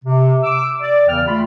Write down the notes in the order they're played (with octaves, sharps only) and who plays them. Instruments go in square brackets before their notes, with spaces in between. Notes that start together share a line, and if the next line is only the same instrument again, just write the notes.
[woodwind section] C3
D6 E6
D5
E2 C#3 E3 G5 F6
A3 F4 B5